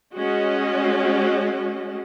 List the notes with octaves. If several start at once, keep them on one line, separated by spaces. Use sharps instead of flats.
G#3 C#4 F#4 D#5